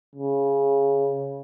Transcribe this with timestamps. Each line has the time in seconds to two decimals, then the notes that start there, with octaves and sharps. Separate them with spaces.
0.15 C#3